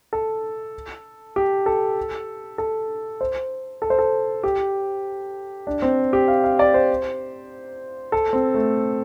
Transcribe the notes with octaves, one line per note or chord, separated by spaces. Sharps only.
A4
G4
A4
A4
C5
A4
C5
A4
G4
D4
C4
G4
F5
F5
D5
C5
A4
C4
A3